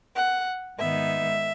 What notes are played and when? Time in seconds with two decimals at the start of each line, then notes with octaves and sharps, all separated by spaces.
0.15 F#5
0.79 G#2 D#3 G#3 B3 D#4 E5